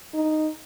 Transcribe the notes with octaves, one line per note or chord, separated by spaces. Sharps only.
D#4